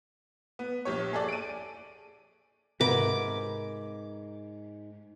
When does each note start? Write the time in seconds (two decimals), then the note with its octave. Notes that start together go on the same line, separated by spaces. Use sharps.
0.59 B3
0.85 A#1 G4 C#5
1.13 G#4 A4 D5
1.28 D7 D#7
2.81 G#2 C3 A#4 B4 D6